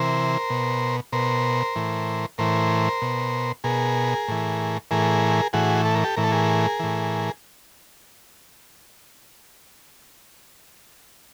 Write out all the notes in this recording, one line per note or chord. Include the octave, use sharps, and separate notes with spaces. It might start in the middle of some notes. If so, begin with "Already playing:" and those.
Already playing: C3 E3 A#4 C5
B2
B2 A#4 C5
A2 E3
A2 E3 A#4 C5
B2
B2 G#4 A#4
A2 E3
A2 E3 G#4 A#4
A2 E3 F#4 G#4
A4
A#4
G4 A4
A2 E3 A#4
A4
G#4 A#4
A2 E3